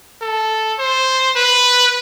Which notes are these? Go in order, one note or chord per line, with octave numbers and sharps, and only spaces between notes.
A4
C5
B4